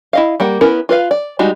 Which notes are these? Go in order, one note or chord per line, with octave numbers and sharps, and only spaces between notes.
E4 D#5 F5
G3 A#3 F#5
B3 C#4 E4 A#4
F4 B4 F5
D5
G3 G#3 D#4 F#4